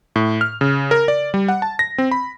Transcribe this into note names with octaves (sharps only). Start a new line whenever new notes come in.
A2
F6
C#3
A#4
D5
G3
F#5
A5
A#6
C4
B5